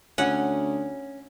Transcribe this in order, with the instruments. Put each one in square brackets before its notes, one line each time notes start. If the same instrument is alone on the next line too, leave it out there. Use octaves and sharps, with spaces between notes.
[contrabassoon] D2 [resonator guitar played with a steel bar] C#4 [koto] F#5